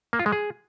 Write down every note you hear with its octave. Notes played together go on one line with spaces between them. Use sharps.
A#3
F4
G#3
G#4